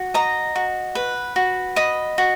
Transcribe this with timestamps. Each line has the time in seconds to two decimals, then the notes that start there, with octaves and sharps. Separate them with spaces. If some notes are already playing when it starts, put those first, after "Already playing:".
Already playing: F#4
0.14 D#5 A#5
0.56 F#4
0.95 B4
1.36 F#4
1.76 D#5 B5
2.18 F#4